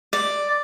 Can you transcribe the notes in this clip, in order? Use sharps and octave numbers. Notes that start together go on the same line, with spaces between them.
D5